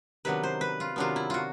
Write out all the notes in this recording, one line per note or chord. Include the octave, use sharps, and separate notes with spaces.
C3 D#3 F#3 B3 D4 B4
C5
B4
F4
C3 D#3 F#3 B3 D4 F4
E4
F4 F#4